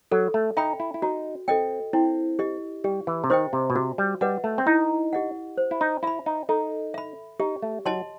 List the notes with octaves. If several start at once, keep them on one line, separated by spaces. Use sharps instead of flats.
F#3 A4
A3
D#4 E5 G5 B5
E4
E4
D#4 F#4
C4 A4 D#5 G5
C4 E4
G4 D#5
G3 G4
E3
C3
D#3 C5 D#5 G5
C3
B2
C3 F#4
G3
G3 B4 D#5 F#5
A3
C4
D#4 E4
G4 D#5 F#5
C5
E4
D#4
E4 E5 B5
D#4
D#4 A4
E5 B5
D#4 G4
A3
F#3 D#5 A5 C6